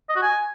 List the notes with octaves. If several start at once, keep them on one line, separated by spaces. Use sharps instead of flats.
D#5
F#4
G#5